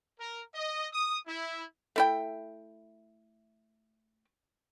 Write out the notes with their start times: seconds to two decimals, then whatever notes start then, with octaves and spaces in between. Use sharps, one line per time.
0.19 A#4
0.55 D#5
0.93 D#6
1.27 E4
1.96 A3 E4 G5